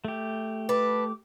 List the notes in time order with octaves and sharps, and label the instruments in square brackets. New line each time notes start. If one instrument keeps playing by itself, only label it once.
[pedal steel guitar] A3 G4
[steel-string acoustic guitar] A4 B4 [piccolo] D6